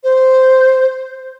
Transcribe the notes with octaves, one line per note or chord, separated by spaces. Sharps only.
C5